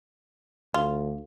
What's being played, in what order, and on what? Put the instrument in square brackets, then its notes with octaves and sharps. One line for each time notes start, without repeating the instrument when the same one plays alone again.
[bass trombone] D2 [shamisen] F4